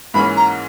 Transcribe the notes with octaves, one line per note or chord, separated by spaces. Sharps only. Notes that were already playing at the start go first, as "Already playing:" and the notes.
G#2 E3 A#3 C#4 B5
A#5